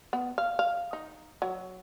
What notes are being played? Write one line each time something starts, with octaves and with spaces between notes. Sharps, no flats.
B3
F5
F5
D#4
F#3